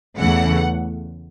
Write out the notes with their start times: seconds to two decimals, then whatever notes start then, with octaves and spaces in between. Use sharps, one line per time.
0.19 E2 C#3 E3 A3 F#5